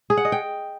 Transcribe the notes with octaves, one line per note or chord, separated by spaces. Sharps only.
G#4
F#5
D#5
G5